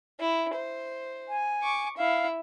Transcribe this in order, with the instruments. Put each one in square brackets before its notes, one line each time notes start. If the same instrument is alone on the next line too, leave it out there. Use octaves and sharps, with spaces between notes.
[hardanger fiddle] E4
C5
[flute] G#5
[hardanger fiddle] C#6 D6
[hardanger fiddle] E4 E5 [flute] F5